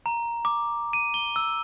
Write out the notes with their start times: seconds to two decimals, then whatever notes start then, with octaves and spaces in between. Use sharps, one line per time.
0.06 A#5
0.45 D6
0.93 D#7
1.14 G7
1.36 E6